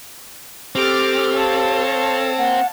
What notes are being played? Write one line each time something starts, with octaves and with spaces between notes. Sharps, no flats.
C4 G4 A4 D6 F6 A6
C#5 F5 A5
A#3 F#5